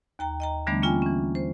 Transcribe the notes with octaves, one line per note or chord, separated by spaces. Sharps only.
D#2 G5 A#5
D#5 G5 A#5
D3 E3 G3 A3 B3 D4
A#3 C#4 F4 G5 G#5
E3 C#4
C5